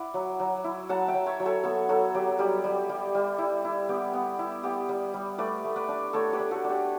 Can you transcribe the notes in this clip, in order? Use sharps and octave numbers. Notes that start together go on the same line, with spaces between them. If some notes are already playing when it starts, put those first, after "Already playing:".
Already playing: E4 D5 F#5
F#3
F#3
E4
F#3 F#5 A5
E5 G5
F#3
C#5 E5
F#3
A4 C#5
B3 A4 C#5
F#3 F#4 A4
F#3 G4
G3 G4
G3
G3
G3
E4
E4
B3 G4
B3
E4
B3 G4
G3
G3
A3 B4 D5
A3
B4 D5
D4
A3 A4 C#5
G4 B4
D4
F#4 A4
D4
G4